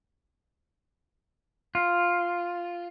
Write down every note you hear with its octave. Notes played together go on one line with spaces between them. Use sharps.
F4